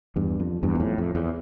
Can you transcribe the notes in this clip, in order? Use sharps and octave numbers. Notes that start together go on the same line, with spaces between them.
E2 G2
F2
E2 G2
A#2
F2 A2
F2
E2